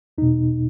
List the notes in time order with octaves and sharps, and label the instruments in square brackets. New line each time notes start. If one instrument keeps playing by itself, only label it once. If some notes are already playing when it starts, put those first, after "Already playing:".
[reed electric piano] E2 B2 D#4